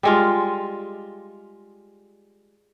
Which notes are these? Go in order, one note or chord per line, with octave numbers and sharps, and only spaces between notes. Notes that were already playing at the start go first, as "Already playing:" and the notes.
G3 G#3 F4